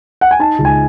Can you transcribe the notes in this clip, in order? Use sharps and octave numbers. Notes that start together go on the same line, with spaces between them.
F#5
G#5
D#4 A5
C#2
G#5